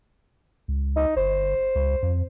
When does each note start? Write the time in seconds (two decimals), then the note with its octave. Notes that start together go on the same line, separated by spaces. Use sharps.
0.68 C#2
0.96 D#4
1.16 G1 C5
1.75 C#2
2.02 F2